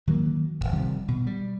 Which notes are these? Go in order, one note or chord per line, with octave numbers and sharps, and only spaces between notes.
D#3 F#3 G#3 A#3
D#1 B1
C3 D#3 F3 G3
B2
G3